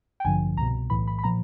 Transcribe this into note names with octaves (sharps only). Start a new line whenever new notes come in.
G5
A1 G2 D3 F3 G#5
C2 B2 A#5
B1 A2 E3 B5
B5
B5
A#2 F3 A#5